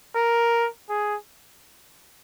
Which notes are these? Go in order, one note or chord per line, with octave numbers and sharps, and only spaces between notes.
A#4
G#4